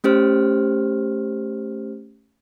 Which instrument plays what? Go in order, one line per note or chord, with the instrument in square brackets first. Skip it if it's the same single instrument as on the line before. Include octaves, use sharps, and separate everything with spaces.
[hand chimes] A3 C#4 G4 C5 F6